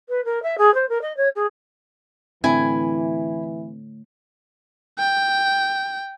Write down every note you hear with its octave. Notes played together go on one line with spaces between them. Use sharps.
B4
A#4
E5
G#4
C5
A#4
D#5
C#5
G#4
A2 D3 E3 C4 E4 G#5
G5